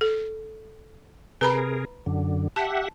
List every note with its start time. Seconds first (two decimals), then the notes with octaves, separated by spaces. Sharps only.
0.01 A4
1.41 C3 G#4 A#4 B4 A#5 B5
2.06 F#2 D3
2.56 G4 E5 F#5 A5